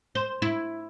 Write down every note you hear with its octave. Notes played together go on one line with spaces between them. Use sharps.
C5
E4